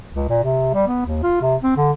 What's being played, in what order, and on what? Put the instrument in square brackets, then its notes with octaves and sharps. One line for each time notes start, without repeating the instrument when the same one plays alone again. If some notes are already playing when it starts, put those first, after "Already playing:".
[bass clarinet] C#2
A#2
C3
G3
B3
D#2
F4
C3
C4
D3